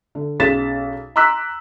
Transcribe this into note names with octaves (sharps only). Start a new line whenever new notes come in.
D3
B1 C#4 G#4 A6 B6 E7
A#5 C6 D6 E6 F#6 B6